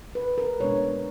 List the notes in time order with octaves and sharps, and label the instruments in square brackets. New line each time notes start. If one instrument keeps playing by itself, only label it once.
[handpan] B4
A#4
B2 G#3 B3 D4 C#5